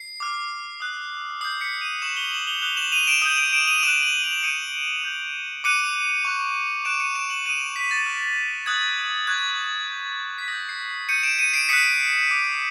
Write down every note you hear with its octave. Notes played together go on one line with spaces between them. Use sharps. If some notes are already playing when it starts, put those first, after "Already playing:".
Already playing: C7
D6 F6
D#6 F#6
D#6 G6 C7
B6 C#7
D#7 F7
C#6 F6 E7 F#7
F7 G7
E7 F#7
F7 G7
D#6 F#6 F7 G7
E7 F#7
D#7 F7
D7 E7
D#6 G6
D7 E7
D7 E7
D#7 F7
D#6 F#6 E7 F#7
E7 F#7
D#7 F7
D#6 G6 C#7 D#7
D#6 G6
D6 F#6 C#7 D#7
C#6 F#6
D6 F#6 D7 E7
C#7 D#7
D7 E7
E7 F#7
D#6 F#6 D#7 F7
D7 E7
B6
A6
C#6 F6
D#6 F#6 G#6
C#6 F#6 G#6
D#6 G6
B6
D#6 G6 A#6
C7
D#6 G6 C#7 D#7
D7 E7
C#7 D#7
C7 D7
D#6 F#6 B6 C#7
D6 F#6